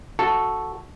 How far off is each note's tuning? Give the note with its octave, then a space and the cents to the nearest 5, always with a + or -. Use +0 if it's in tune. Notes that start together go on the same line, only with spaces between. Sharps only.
F#4 +0 A4 +0